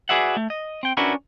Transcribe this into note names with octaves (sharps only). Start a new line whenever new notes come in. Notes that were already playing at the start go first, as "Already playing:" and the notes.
F#4 G#4 B4 D5 E5 F#5
A3
D#5
C4 G5
C#4 D4 E4 F#4 A#4 B4